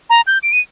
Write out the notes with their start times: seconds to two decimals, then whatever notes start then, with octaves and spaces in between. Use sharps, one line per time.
0.10 A#5
0.27 G6
0.43 D7
0.52 D#7